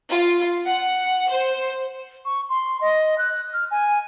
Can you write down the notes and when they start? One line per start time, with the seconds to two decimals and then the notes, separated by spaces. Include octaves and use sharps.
0.10 F4
0.65 F#5
1.29 C5
2.25 C#6
2.49 C6
2.81 D#5
3.18 F#6
3.53 F6
3.71 G#5